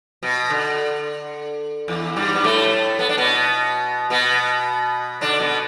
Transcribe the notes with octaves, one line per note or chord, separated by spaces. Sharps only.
B2
D3
E2 E3
G2 G3
B3
A2 A3
B3
D4
B2 B3
B2 B3
D3 D4
B2 B3